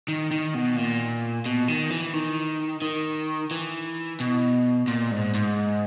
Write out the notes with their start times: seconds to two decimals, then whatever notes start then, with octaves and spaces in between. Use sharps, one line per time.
0.08 D#3
0.31 D#3
0.54 B2
0.76 A#2
1.46 B2
1.68 D#3
1.91 E3
2.13 D#3
2.82 D#3
3.51 E3
4.20 B2
4.88 A#2
5.11 G#2
5.34 G#2